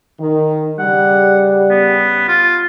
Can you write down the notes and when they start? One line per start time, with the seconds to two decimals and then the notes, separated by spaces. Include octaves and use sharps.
0.21 D#3
0.79 C#3 G3 F#5
1.70 B3
2.28 F4